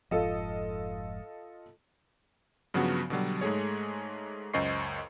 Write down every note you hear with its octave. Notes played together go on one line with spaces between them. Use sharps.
F1 G#2 F3 F4 A4 D#5
G2 C#3 F3 F#3 B3 F#4
B2 D3 F#3 G3
G#2 G#3 A3 G#4 C#5
C#2 F#2 C5 D#5 C#6 C7